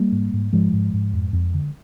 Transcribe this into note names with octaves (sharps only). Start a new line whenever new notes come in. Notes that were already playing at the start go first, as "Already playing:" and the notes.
Already playing: G3 A#3
G#2
G#2
G#2 F3 G#3
G#2
G#2
F2
F2
D3